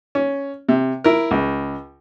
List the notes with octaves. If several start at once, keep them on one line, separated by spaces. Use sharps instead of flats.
C#4
C3
E4 A#4
C#2